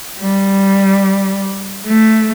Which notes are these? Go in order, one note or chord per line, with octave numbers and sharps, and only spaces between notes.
G3
A3